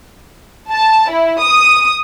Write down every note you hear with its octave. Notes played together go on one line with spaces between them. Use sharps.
A5
E4
D#6